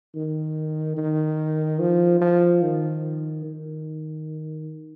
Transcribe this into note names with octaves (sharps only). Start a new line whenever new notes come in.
D#3
D#3
F3
F3
D#3
D#3